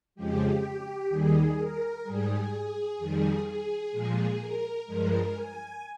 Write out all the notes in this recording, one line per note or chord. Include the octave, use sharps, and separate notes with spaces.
F2 C#3 F3 G#3 G4
D#2 D#3 G3 G#4
A#4
G#2 G3 G#4
F2 D#3 G3
G#4
A#2 F3 G#3
A#4
G2 F3 G#3 A#4
G#5